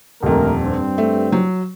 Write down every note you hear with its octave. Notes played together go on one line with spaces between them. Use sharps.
D#1 F2 D3 A3 A#4
G2 C4
A3
F#3